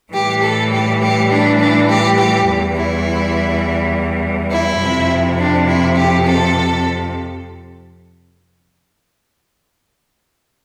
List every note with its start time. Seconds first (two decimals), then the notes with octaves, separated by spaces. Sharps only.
0.13 A2 E3 G3 G4
0.42 A4
0.72 G4
1.01 G4
1.30 D4
1.59 D4
1.88 G4
2.17 G4
2.47 E2 E3 G3
2.76 E4
4.50 E4
4.80 F2 C3 F3
5.38 D4
5.67 E4
5.96 G4
6.26 A4